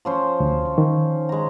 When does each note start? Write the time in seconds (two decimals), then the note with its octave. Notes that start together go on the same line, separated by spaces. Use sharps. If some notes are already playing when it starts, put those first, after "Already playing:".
0.05 F3 C#4 C5
0.40 D2
0.78 D#3
1.29 G#3 A#5